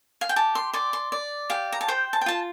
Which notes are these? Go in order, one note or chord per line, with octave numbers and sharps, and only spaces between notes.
F5
G5
G4 A5
C6
D5 C6
C6
D5
G4 F5
A#5
A5
C5 G5
A5
G5
F4 A5